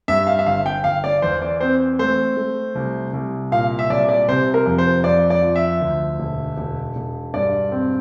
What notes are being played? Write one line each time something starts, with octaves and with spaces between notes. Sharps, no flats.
G2 E5
F5
E5
G1 F5
G5
G1 F5
D5
E2 C5
D5
C4 C5
A3 C5
A3
C2
C2
A#2 F5
E5
C2 D5
D5
C3 C5
A#4
F2
C5
F2 D5
D5
F3
E5
D2
E1
E1
E1
G2 D5
C4